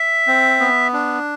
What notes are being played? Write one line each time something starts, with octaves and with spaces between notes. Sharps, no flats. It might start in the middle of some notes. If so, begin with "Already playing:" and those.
Already playing: E5
C4
B3
D4